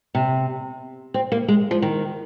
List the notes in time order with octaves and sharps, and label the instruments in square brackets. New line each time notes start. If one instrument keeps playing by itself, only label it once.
[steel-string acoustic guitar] C3
C4
A#3
G#3
F3
D#3